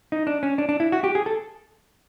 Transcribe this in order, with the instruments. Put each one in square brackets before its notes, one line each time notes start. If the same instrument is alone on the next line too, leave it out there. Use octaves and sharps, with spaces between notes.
[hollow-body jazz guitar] D#4
D4
C#4
D4
D4
E4
F#4
G4
G#4
A4